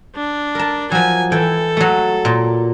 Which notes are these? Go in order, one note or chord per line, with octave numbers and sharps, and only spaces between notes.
D4
A#4 A5
F3 F#3 G#5
E3 A4 G5 G#5
F#3 A3
A#2